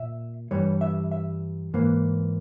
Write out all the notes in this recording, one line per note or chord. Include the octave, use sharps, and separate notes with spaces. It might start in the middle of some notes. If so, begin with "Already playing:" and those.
Already playing: A#2 E5
G2 E3 G3 C#5
E5
E5
G#2 E3 A#3